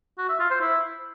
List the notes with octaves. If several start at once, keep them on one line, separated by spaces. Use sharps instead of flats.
F#4
E5
F4
C5
E4